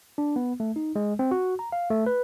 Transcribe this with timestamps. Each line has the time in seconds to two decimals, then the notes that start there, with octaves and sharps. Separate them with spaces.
0.18 D4
0.36 B3
0.60 A3
0.76 D#4
0.96 G#3
1.19 C4
1.31 F#4
1.59 A#5
1.72 F5
1.90 A3
2.06 B4